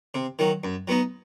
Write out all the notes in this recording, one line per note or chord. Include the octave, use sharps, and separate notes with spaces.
C3
D#3 F#3
F#2
F#3 B3 D#4